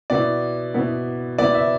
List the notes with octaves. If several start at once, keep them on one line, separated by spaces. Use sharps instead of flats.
B2 B3 E4 D5
B2 B3 E4
B2 B3 E4 D5
E5